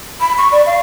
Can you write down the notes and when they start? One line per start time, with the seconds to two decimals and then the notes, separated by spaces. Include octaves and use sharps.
0.20 B5
0.38 C#6
0.52 D5
0.66 F5